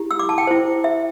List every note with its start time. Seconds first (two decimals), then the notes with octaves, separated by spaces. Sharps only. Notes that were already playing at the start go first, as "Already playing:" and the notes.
Already playing: E4 G4
0.11 E6
0.19 D6
0.29 A5
0.38 G5
0.47 E4 C5
0.84 E5